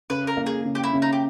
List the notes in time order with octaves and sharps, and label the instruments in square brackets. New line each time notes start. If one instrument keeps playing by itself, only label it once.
[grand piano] C#3 [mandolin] B4
[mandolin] A#4
[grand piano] A#3
[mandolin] G#4
[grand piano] C#3
[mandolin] G4
E4
[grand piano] C#3
[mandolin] D#4
G4